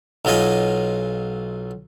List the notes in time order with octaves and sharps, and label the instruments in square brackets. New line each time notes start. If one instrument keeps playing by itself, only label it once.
[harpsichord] B1 F#3 F4 D#5 G#5